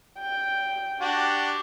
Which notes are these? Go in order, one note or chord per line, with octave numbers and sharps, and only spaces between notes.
G5
D4 F#4 G4